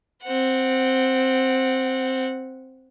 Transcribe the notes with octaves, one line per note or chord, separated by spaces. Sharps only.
C4 F#5